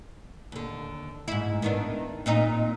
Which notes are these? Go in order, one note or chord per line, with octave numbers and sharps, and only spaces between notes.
D#2 D3
G#2 E4
D#3 B3 D4
A#2 C4 D#4